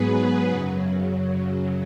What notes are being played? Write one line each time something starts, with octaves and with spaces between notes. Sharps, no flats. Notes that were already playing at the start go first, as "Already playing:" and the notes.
Already playing: G#2 F#3 B3 G#4 B4
F#2 C#3 F#3